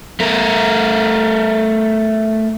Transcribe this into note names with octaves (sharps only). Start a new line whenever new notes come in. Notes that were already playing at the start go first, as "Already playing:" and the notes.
A3 A#4